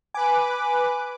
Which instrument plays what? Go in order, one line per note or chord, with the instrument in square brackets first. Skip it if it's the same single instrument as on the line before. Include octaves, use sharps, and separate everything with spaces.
[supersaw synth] B4 D6 [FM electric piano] G#5